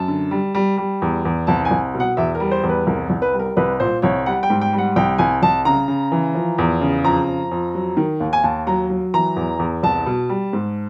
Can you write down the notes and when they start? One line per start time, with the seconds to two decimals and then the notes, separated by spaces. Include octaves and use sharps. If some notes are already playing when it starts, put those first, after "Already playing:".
Already playing: F#2 A5
0.08 D3
0.31 G3
0.55 G3
0.77 G3
1.02 E2
1.25 E2
1.47 C2 A5
1.65 G#5
1.71 C2
1.95 B2
2.00 F#5
2.17 E2 E5
2.35 A#4
2.40 G3
2.51 C5
2.63 E2
2.69 B4
2.87 C2 A#4
3.10 C2
3.22 B4
3.33 G3
3.39 A#4
3.57 C2 B4
3.80 A#2 C5
4.02 C2 C#5
4.26 G3 F#5
4.43 G5
4.50 G#2
4.61 G5
4.73 G3
4.78 F#5
4.96 C2 G5
5.18 C2 G#5
5.43 C2 A5
5.65 C#3 A#5
5.88 C#3
6.12 E3
6.35 F3
6.58 E2
6.81 C#3
7.04 F2 A#5
7.28 F2
7.51 F2
7.75 F#3
7.97 D#3
8.20 D#2
8.33 G#5
8.43 D#2 A5
8.67 F#3 A#5
8.90 F#3
9.14 E3 A#5
9.36 E2
9.59 E2
9.83 C2 A5
10.06 B2
10.29 G3
10.53 G#2